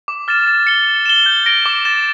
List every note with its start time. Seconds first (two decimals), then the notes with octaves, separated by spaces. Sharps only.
0.08 D6
0.28 F6 A6 E7
0.47 A6
0.67 C#7 G7
0.87 A6
1.06 E7 G7
1.26 G6
1.46 A#6 D7 G7
1.66 D6
1.85 A6 E7